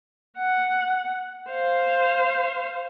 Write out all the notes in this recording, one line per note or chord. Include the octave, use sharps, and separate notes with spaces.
F#5
C5 F5